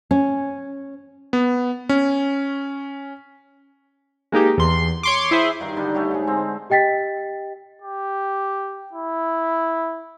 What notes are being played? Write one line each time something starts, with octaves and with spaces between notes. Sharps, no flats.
C#4
B3
C#4
G#3 A#3 D#4 G4
E2 C6
C#5 C6 D6
E4 G#4 C5 E5
G2 D#3
D3 G3 D4 D#4
A3 G4 C#5
G#2 G#4
D3 G#3 C4
G4 D#5 G5 A6 B6
G4
E4